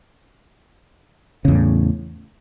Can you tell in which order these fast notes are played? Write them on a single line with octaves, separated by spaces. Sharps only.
C#3 E2 A2